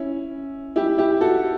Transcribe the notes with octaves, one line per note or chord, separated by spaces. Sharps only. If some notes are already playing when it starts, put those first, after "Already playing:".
Already playing: C#4 E4
E4 G4
E4 G4
F#4 A4